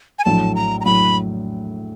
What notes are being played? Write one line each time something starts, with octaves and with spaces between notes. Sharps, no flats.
G#5
A#1 A2 F#3 A5
A#5
A#5
A2 F#3 B5